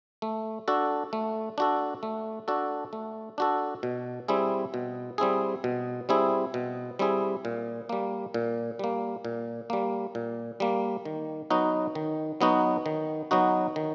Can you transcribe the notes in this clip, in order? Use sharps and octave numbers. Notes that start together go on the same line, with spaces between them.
A3
D4 F#4 A4
A3
D4 F#4 A4
A3
D4 F#4 A4
A3
D4 F#4 A4
B2
G3 C4 E4 G#4
B2
G3 C4 E4 G#4
B2
G3 C4 E4 G#4
B2
G3 C4 E4 G#4
A#2
G3 A#3
A#2
G3 A#3
A#2
G3 A#3
A#2
G3 A#3
D#3
F#3 B3 D#4 F#4
D#3
F#3 B3 D#4 F#4
D#3
F#3 B3 D#4 F#4
D#3